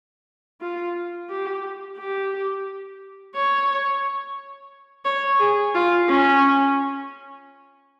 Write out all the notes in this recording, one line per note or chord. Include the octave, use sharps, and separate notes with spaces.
F4
G4
G4
C#5
C#5
G#4
F4
C#4